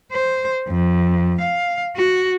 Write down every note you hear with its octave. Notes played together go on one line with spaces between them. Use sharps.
C5
F2
F5
F#4